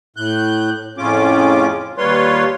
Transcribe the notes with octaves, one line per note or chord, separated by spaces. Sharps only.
A2 F#6 G6
F2 A2 C#3 C#4 F4 D6
D#2 G3 F4 B4 C#5 C6